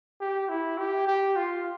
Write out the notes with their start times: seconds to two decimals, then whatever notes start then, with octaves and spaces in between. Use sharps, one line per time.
0.21 G4
0.49 E4
0.78 G4
1.07 G4
1.36 F4